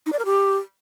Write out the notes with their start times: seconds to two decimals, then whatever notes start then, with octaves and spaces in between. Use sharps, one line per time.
0.06 D#4
0.13 D5
0.19 A#4
0.25 G4